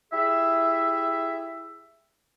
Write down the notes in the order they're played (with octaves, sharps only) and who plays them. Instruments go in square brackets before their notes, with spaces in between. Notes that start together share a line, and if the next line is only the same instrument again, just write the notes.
[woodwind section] E4 G4 G#4 E5